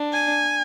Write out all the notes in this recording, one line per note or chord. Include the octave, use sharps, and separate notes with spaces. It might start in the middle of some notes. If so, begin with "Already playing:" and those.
Already playing: D4
G#5